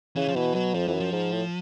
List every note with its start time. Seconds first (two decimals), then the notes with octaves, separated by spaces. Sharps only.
0.16 C#3 E3
0.28 F3
0.35 B2 E3
0.55 B2 F#3
0.74 F2 F3
0.88 F2 E3
0.94 F#2
1.00 F3
1.12 G#2
1.32 A2